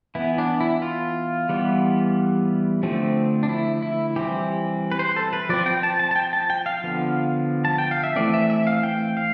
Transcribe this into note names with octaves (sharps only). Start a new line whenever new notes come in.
E3 B3 E4
D4
E4
F4
E3 G3 B3
D3 F3 A3 C4
D4
E4
E4
E3 G3 C4 G4
B4
C5
A4
B4
F3 C4 D5
G5
A5
A5
A5
G5
A5
G5
F5
D3 F3 B3
A5
G5
F5
E5
E3 A3 C4 D5
E5
E5
F5
G5
F5